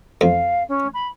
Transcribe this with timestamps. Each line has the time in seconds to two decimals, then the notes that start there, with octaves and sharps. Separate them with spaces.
0.21 F2 F5
0.69 C#4
0.94 B5